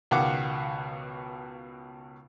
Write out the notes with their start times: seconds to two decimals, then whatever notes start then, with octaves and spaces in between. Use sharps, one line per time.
0.11 C#2 B2 D#3 F5 F#5 D6